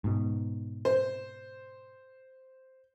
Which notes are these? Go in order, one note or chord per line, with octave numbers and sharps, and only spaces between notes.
G#2 B2
C5